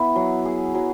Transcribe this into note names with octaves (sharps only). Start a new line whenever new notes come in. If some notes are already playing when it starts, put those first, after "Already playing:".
Already playing: B3 E4
F#3
G#4
F#3